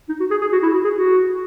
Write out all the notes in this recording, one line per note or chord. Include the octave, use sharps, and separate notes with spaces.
D#4
F#4
G#4
G#4
F#4
E4
F#4
G#4
F#4